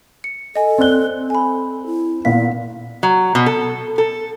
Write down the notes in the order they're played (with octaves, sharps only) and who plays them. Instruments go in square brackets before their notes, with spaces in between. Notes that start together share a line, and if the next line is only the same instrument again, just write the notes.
[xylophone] C#7
[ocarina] A4 [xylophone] D#5 G#5
[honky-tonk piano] C4 F#6 [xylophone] D5 G7
[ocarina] A4 [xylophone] G#5 B5
[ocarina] E4
[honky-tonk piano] A#2 B3 F5 [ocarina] E4 [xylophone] B6
[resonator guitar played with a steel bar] F#3
B2
A4
A4